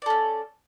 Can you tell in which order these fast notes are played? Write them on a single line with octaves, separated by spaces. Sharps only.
D5 A4 C#4